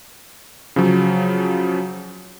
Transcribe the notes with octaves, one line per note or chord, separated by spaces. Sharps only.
C#3 F3 F#3